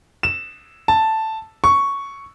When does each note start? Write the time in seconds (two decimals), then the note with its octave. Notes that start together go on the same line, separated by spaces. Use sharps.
0.23 E7
0.88 A5
1.64 C#6